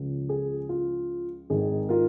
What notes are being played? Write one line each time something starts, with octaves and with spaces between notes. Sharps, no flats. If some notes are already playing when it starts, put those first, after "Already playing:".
Already playing: C#2 C#3 F3
G#4
F4
G#1 G#2 D#3 G#4
F4 A#4